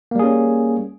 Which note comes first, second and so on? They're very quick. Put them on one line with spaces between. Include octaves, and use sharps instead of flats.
A#3 G3 G#4 C#4